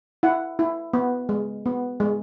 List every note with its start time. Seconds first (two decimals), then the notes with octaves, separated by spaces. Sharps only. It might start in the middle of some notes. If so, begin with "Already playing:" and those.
0.23 E4 F#5
0.59 E4
0.93 B3
1.29 G#3
1.66 B3
2.00 G#3